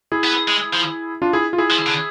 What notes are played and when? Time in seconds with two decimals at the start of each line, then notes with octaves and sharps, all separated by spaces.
0.12 E4 G#4
0.24 B3
0.48 G#3
0.73 F3
1.22 D4 F4
1.33 E4 G#4
1.53 F4
1.58 E4 G#4
1.70 F3
1.87 D3